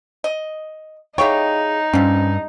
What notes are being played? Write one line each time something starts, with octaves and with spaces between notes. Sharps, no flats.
D#5
D#4 E4 G4 G#4 C#5 F5 G5
G2 F3 C4 C#4